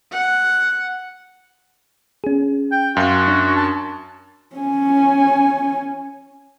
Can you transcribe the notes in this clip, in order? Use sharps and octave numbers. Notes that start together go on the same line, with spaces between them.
F#5
C#4 G#4
G5
F#2 F#4 F5 C6
D4
A5
C#4 G#5